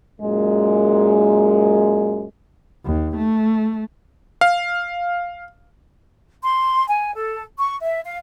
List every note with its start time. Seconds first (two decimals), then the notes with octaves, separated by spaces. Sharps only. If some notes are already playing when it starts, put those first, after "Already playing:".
0.21 F#2 A#2 G#3
2.85 D#2
3.17 A3
4.41 F5
6.43 C6
6.88 G#5
7.15 A4
7.58 C#6
7.82 E5
8.05 F5